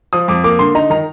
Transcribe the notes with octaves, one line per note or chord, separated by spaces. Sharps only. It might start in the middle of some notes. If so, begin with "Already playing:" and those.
F3 D#6
F2 D6
A#3 D6
D3 C6
D#4 A#5
D#3 A#5